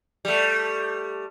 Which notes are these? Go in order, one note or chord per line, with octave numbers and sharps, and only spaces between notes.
G3 A3